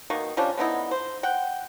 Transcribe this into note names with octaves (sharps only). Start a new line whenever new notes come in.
B2 D#3 A#3 C#6
F3 G3 C#4 D4
D3 B3 D#4 E4
C5
F#5 G5